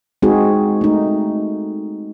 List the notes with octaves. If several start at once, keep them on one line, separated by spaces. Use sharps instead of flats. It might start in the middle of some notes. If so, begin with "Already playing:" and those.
G#3 C4 D#4 F#4 G#4
A3 D#4